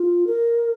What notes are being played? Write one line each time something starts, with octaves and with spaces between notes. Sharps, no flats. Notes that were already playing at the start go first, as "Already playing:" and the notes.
Already playing: F4
A#4